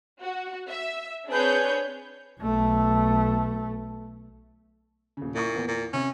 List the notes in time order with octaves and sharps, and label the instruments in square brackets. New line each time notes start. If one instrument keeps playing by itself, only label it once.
[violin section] F#4
E5
C4 D4 G#4 B4 C#5 G6
[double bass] B1 A3
[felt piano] D#1 C#3
[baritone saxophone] A#2 [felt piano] E4 C#6
[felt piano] E2 B3
[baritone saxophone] A#2
[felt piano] C3 [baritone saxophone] C#4